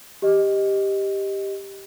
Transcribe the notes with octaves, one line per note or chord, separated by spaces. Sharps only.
G4 D#5